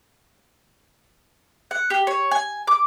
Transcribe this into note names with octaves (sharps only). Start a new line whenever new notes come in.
F#5
G4
C#5
G#5
D6